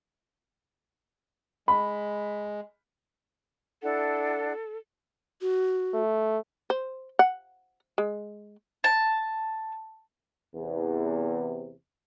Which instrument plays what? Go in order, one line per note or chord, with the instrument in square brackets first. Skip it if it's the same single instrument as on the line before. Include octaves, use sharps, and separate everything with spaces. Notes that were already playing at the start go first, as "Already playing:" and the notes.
[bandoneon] G#3 [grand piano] B5
[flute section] D4 E4 F#5 [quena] A4
[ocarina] F#4
[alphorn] A3
[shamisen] C5
F#5
G#3
[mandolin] A5
[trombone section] E2 C3